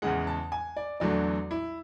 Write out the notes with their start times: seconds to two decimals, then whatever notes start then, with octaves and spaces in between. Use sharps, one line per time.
0.02 E2 C#3 G#3 F#5
0.27 A5
0.52 G#5
0.77 D5
1.00 E2 D3 F#3 A3 D5
1.51 E4